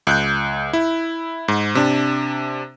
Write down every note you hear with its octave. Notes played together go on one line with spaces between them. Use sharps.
C#2 F#6 G6
E4
G#2
C3 D4